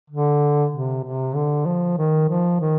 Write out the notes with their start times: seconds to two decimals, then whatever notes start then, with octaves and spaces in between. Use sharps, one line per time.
0.10 D3
0.73 C3
1.04 C3
1.35 D3
1.66 F3
1.98 D#3
2.29 F3
2.61 D#3